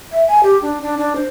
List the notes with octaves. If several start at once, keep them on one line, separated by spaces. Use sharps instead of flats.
E5
G#5
G4
D4
D4
D4
C5